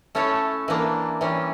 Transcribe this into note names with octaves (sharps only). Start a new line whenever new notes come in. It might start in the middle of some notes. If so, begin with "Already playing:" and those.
A3 C#4 E4 A4 C#5
E3 A#3 D4
E3 G3 C#4